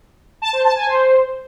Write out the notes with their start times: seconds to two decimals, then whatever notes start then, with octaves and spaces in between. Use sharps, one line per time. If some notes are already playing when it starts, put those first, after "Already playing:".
0.42 A5
0.53 C5
0.64 A5
0.76 G#5
0.87 C5